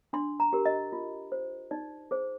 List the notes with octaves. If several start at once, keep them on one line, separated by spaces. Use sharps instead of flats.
D4 C6
A#5
G4 A#4
D#5
F4
C5
D#4 D5
G#4 C5